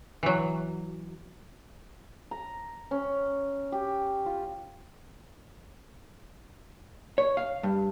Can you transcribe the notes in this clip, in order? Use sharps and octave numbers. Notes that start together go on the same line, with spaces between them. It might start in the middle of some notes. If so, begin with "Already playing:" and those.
E3 F#3
A#5
C#4
G4
F4
C#5
F5
G2